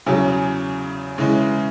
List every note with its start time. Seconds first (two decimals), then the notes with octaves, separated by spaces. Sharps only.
0.06 E2 C#3 F#3
1.18 C#3 E3 G#3